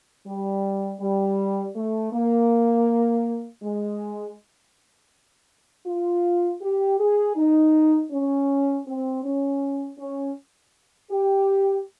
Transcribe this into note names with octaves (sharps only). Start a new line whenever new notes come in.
G3
G3
A3
A#3
G#3
F4
G4
G#4
D#4
C#4
C4
C#4
C#4
G4